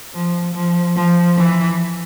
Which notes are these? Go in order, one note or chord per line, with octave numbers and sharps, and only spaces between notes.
F3
F3
F3
E3